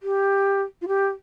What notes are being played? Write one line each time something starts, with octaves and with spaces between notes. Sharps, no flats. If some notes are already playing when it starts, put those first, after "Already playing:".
G4
F4
G4